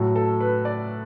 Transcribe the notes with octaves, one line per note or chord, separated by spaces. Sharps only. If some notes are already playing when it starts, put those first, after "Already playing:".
Already playing: A2 F#3 A4
A4
B4
D5